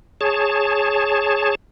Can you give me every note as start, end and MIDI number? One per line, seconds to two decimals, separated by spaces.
0.21 1.55 68
0.21 1.55 73
0.21 1.55 81